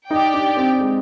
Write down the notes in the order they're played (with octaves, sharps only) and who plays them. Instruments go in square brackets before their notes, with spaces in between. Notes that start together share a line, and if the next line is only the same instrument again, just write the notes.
[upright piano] D#4 [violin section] G4 D5 G5
[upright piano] D4
C4
G#3